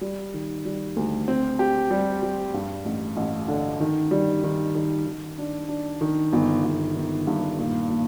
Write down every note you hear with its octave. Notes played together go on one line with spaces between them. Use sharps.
G3
D#3
G3
D2
C4
G4
G3
G3
G2
A1
A1
D3
D#3
G3
D#3
D#3
D#3
D4
D4
D#3
G1
G1
D#3
G2
A#2
A#2